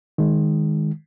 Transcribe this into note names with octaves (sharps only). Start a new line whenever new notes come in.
D#3 G#3